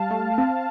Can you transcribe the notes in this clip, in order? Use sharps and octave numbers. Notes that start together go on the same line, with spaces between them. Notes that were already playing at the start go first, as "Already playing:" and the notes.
Already playing: G3 F5 A5
A3
C4